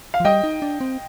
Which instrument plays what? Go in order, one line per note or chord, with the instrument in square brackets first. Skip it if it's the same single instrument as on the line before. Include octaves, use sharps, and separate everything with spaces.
[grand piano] F5
[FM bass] F3
[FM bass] G3 [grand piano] D#5 G5
[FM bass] D#4
D4
C4